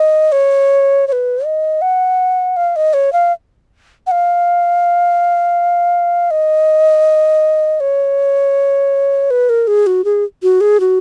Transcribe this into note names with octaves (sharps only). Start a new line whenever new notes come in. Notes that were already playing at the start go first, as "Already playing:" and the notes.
Already playing: D#5
C#5
C#5
B4
D#5
F#5
F5
D#5
C#5
F5
F#5
F5
D#5
C#5
B4
A#4
G#4
F#4
G#4
F#4
G#4
F#4